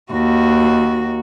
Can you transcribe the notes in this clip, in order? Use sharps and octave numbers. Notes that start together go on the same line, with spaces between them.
D#2 F#4